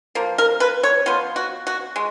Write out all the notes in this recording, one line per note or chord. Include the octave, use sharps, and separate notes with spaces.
F3 A#3
A#4
B4
C#5
F3 B3 F4
F#4
F#4
G#3